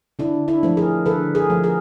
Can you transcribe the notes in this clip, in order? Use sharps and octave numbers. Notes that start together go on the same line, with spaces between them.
D3 D4 E4
D4 E4
F3 A3
G#4 A#4
D3 A4 B4
G#4 A#4
F3 A3
G#4 A#4